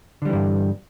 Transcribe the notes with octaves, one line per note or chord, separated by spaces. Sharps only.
G2 D3 E3 G3